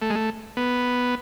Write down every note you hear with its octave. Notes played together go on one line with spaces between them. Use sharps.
A3
G#3
A3
B3